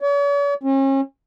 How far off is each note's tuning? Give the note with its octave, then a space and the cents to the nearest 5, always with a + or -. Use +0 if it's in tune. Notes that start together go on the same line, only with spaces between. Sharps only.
C#5 +45
C#4 -40